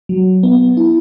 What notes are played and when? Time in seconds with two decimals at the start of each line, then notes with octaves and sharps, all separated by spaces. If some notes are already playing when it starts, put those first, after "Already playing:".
0.09 F#3
0.43 B3
0.77 E4